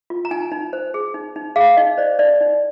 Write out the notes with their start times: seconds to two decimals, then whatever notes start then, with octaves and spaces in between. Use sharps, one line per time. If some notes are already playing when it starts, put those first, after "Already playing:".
0.10 F4
0.25 A#5
0.31 D#4 G#5
0.52 D#4
0.73 C5
0.94 G#4
1.14 D#4
1.36 D#4
1.56 G#4 F5
1.77 D#4 D#5
1.98 C5 D5
2.19 D#4 D5
2.41 D#4